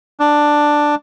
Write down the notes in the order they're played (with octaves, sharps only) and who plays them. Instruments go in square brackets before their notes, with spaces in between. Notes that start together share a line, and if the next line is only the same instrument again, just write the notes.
[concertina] D4